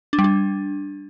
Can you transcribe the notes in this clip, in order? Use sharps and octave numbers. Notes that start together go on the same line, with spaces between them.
D4
G3
D4